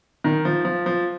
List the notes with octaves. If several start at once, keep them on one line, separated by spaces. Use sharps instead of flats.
D#3
F3
F3
F3